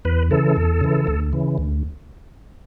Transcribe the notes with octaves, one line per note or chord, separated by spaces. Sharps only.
E2 B4
C#3 E3 A4
E2
C#3 E3
D2
C#3 E3
D2